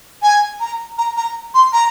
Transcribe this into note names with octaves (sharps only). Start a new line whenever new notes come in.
G#5
A#5
A#5
A#5
C6
A#5